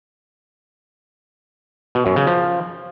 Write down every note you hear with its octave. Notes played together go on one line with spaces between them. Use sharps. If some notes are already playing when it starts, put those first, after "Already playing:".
B2
F#2
C#3
F3